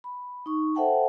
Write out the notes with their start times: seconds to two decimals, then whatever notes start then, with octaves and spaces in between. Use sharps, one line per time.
0.04 B5
0.46 D#4 C#6
0.75 A4 C5 E5 F#5 G5 A5